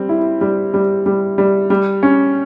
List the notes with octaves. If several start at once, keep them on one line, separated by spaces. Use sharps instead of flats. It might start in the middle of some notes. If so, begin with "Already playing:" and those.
Already playing: G3 C4
E4
G3
G3
G3
G3
G3
C#4